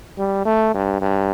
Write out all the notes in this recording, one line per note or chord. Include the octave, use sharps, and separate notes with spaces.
G3
A3
G2
G2